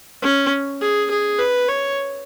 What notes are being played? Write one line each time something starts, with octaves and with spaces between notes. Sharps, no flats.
C#4
G#4
G#4
B4
C#5